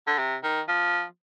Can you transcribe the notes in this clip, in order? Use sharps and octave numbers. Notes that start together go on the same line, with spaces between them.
D3
C3
D#3
F3